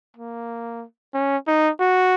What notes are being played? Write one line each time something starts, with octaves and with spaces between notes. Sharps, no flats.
A#3
C#4
D#4
F#4